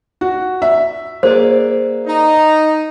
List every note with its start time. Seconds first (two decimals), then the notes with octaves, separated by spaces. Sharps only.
0.21 F#4
0.62 E5
1.23 A#3 G#4 C5 D5
2.06 D#4